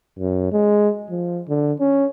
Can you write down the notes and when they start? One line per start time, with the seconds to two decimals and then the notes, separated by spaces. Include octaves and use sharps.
0.19 F#2
0.52 G#3
1.11 F3
1.48 D3
1.80 C#4